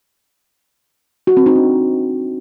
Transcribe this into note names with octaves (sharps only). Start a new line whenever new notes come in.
F#4
C4
D#4
D4